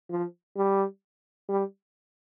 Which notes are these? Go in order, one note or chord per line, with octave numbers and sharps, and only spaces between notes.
F3
G3
G3